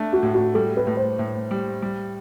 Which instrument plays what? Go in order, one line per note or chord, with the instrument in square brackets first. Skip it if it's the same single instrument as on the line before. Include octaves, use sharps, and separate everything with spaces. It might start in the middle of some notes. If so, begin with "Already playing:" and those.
Already playing: [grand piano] A3 D4
[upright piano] F#4
[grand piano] A2
[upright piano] F#4
[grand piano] G3 [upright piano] A4
[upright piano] B4
[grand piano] A2
[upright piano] C5
[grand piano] A2
G3
G3